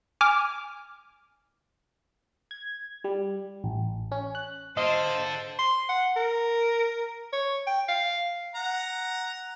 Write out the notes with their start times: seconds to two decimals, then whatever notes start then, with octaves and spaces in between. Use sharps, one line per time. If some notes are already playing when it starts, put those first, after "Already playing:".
0.21 G#5 D6 F6
2.51 G#6
3.04 G3
3.64 A1
4.12 C#4
4.35 F#6
4.77 F4 A4 C5 D5 D#5
5.59 C6
5.89 F#5
6.16 A#4
7.33 C#5
7.67 G5
7.89 F5
8.55 F#5 A#5